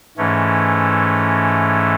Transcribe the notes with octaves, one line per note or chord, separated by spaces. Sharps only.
G#2 E3 A3 C#4